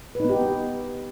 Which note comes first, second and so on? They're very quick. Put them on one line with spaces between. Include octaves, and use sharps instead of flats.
B4 D#4 B3 G4